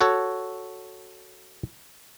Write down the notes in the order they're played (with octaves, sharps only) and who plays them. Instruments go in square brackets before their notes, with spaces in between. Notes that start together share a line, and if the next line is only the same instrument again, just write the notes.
[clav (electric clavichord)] F#4 A4 C#5